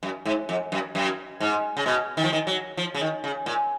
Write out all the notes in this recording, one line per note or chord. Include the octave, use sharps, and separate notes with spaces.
F#2
G#2
F2
F#2
F#2
G#2
C#3
B2
D#3
F3
D#3
F#3
F3
C#3
D#3
C#3
A#2